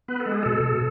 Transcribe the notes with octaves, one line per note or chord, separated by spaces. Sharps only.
B3 B4
A4
G#3
G#4
B2 A4
B2